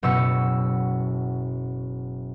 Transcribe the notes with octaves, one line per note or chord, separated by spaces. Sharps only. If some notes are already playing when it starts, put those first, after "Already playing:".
F#1 B2 E6 C#7